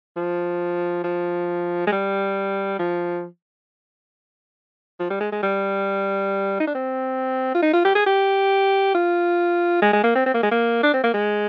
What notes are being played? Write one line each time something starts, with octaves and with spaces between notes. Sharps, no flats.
F3
F3
G#3
G3
F3
F3
G3
G#3
G#3
G3
D#4
D4
C4
F4
D#4
F4
G4
G#4
G4
F4
G#3
G#3
A#3
C4
C4
A#3
G#3
A#3
D4
C4
A#3
G#3